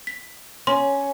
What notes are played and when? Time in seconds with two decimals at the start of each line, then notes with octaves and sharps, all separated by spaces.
0.07 B6
0.67 C#4 C6